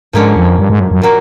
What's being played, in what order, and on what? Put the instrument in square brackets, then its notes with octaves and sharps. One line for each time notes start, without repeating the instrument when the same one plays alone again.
[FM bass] G#2 [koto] D3 F3 A#3 C#4
[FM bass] F2
G2
G#2
F#2
F#2
[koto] A#2 F#3 A#3